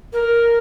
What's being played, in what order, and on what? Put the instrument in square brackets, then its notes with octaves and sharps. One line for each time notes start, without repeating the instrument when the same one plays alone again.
[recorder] A#4